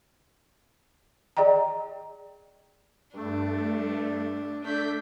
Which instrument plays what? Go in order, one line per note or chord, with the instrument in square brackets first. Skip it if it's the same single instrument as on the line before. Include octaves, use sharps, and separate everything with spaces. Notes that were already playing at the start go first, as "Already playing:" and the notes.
[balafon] G#4 D5 D#5 G5 A#5
[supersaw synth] G2 A3 [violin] D4
[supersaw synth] A3 B6 [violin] D4 G6